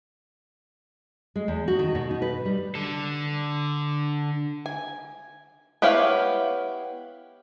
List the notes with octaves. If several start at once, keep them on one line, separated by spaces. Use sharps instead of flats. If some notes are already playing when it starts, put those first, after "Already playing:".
G#3
E2
F#4
D#3
B2
D#4
B4
G3
D3 A4
G#5
B3 E4 G4 C#5 F5